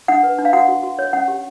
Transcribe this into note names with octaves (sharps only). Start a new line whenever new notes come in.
D4 F#5
B4
D4
F5
F#4 F#5
F#4
F#4
C#5
C#4 F#5
G4